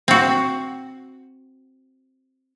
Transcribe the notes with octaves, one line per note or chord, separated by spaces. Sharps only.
C4 F#4